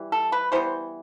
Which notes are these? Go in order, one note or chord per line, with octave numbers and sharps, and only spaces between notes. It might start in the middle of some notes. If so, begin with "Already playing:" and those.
Already playing: E3 G3
A4
B4
E3 G3 B3 C5